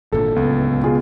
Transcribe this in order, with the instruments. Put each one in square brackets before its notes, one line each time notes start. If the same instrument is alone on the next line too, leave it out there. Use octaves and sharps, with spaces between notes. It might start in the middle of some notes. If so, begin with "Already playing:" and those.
[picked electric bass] G#1 A#2 D3 [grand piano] A4
[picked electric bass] D1 B3 [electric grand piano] C#2
[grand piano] B2 F4 G#4